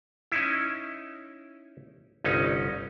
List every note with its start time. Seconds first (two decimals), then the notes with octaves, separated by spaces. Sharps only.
0.32 C#4 D#4 E4
2.24 G1 C2 C#4 D#4